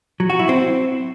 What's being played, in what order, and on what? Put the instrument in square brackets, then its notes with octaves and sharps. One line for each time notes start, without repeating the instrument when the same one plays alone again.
[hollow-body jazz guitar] F#3
F#4
E4
C4